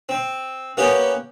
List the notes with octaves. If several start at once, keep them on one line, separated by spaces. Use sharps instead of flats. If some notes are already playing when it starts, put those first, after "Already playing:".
C4
A#3 B3 C#4 G4 B4